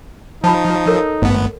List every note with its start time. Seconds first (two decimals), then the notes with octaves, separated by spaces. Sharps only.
0.44 F3 D#4 A5 B5
0.87 A4 A#4 C#5
1.22 G#1 G2 A3 B3